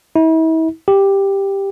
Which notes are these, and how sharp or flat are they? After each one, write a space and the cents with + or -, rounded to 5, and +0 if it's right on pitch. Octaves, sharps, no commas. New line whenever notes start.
E4 -40
G4 +5